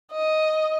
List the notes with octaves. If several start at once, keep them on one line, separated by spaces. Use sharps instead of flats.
D#5